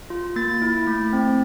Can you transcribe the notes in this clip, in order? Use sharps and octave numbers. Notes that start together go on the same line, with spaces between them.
F4
A#3 A6
E4
A3
C4